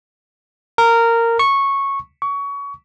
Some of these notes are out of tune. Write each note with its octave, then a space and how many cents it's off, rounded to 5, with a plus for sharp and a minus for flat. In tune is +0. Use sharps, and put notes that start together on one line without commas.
A#4 -15
C#6 -10
C#6 +25